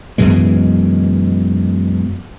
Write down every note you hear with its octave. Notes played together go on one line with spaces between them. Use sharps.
F#2 B2 E3 G#3